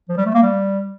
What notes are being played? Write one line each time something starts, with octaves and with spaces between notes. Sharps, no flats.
F3
G3
A3
A#3
G3